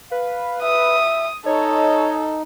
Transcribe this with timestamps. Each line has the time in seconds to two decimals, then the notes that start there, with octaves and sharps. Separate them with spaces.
0.11 B4 F5
0.62 E5 D#6
1.46 D#4 A4 C#5 D#5